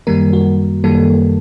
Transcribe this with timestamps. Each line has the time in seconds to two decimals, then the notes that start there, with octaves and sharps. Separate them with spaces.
0.07 F#2 D#3 G3 A#3 A#4
0.33 F#4
0.84 F#2 D#3 G3 A#3 A4